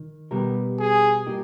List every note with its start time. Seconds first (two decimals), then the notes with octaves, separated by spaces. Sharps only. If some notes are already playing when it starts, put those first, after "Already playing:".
Already playing: D#3
0.31 B2 G3 B3 G4 A#4
0.79 G#4
1.26 A#2 G3 A#3 D#4 G4